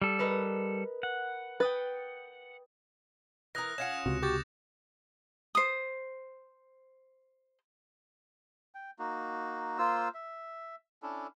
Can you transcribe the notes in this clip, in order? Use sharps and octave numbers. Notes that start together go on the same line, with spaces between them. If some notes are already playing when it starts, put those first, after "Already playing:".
G3 A4
A#4 B4 D#5
F#5
B4 G5 D#6 A6
E3 A#4 D#6 F#6 A#6
C#4 F4 F#5 C#7 E7
C#2 C3 F#4
F#4 G4 C#6 D6 G6 A6
C5 D#6
G5
A#3 D#4 F#4
A#3 F4 C5 E6
E5
C#4 D4 E4 A4